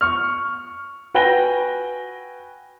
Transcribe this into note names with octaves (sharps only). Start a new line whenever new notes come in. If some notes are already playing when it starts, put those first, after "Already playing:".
C#6 F6
F#4 B4 G5 G#5 A#6 G7